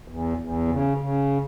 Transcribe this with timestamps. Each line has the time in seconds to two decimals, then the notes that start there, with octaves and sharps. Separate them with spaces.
0.08 E2
0.38 E2
0.68 C#3
0.97 C#3